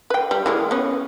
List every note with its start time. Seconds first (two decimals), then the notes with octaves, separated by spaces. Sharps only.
0.10 B4 G5
0.31 G3
0.46 E3 G#3 A#3
0.71 B3 C#4